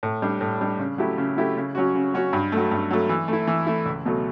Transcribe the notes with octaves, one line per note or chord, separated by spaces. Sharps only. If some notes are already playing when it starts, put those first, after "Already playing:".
A2
G3 D4
A2
G3 D4
C#3
F#3 A3 E4 G4
C#3
F#3 A3 E4 G4
C#3
F#3 C#4 F#4
C#3
F#3 C#4 F#4
G2
F#3 A3
G2
F#3 A3
E3
A3 E4
E3
A3 E4
C#2
B2 F#3 A3